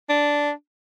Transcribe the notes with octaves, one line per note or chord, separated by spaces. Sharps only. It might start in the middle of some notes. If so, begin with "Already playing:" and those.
D4